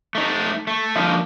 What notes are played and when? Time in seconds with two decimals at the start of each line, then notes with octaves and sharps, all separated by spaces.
0.15 A3 D#4
0.67 A3
0.96 D3 F3 A#3 D#4